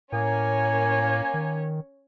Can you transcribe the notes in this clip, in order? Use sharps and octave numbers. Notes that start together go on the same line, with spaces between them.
A2 A#3 C#4 C#5 G#5
D#3